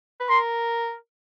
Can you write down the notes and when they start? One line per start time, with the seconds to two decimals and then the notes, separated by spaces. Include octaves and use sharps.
0.20 B4
0.29 A#4 C6